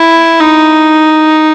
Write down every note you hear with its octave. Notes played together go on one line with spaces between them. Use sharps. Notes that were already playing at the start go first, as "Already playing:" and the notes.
Already playing: E4
D#4